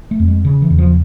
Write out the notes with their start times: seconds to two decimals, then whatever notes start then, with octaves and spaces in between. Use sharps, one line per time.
0.11 A3
0.20 F2
0.28 G#3
0.45 C#3
0.62 E3
0.70 E2
0.78 F3